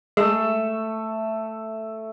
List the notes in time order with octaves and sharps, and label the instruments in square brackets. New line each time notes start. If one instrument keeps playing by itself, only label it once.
[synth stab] G#3 [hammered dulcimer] A3 E5